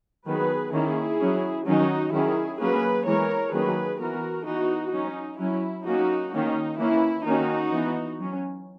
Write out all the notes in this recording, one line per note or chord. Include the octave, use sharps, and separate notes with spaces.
D#3 F#3 B3 G#4 B4
D#3 A#3 C#4 E4 G#4
F#3 C#4
D#3 F#3 C#4 D#4 F#4
D#3 F#3 C#4 E4 G#4
F#3 A#3 C#4 G#4 B4
E3 G#3 B3 A#4 C#5
D#3 F#3 A#3 C#4 G#4 B4
E3 B3 F#4 A#4
E3 B3 D#4 F#4
F#3 C#4 D#4
F#3 C#4 E4
F#3 A#3 C#4 D#4 F#4
D#3 A#3 C#4 D#4
E3 A#3 C#4 E4
D#3 A#3 C#4 D#4 F#4
E3 B3
F#3 C#4